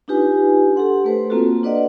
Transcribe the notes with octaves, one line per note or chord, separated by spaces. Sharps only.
D4 D#4 F4 G4 B4 G#5
G4 A4 F#5 C6
A3 B4 C5
A#3 C4 F4 F#4 A4
D4 B4 D5 D#5 F#5